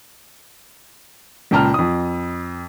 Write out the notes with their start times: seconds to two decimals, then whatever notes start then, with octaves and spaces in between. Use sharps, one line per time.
1.51 C#2 A#2 G5 A5 A#5 F6
1.74 F2 D#6